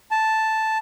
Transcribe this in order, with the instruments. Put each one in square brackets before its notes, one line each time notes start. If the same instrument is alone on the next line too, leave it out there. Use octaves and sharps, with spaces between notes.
[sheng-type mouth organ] A5